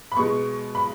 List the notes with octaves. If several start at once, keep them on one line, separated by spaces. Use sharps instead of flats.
B5
B2 G#3 B3 C#6
B5